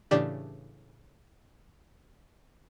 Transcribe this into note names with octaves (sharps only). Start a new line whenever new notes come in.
A2 C#3 E3 D4 G4 D5